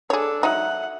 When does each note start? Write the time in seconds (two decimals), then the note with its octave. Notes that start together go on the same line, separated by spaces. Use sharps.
0.10 D4 G#4 A4 C#5
0.43 F#3 D#4 E5 F#5